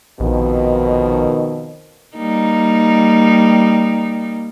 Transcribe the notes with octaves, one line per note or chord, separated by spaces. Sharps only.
A#1 F2 B2 D#3
G3 A#3 D#4